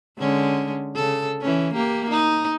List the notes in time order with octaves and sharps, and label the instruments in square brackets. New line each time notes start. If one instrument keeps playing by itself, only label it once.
[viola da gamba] D3 G#3 C#4
C#3 A4
E3 C#4
A#3 G4
D#4